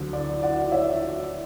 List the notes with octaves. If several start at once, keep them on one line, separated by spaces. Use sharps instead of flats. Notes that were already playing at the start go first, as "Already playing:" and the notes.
Already playing: D2 D3 F#3
D5
D5 F#5
C#5 E5